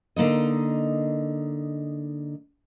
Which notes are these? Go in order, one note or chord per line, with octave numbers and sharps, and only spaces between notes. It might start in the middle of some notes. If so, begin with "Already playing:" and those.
D3 A#3 D#4 D#5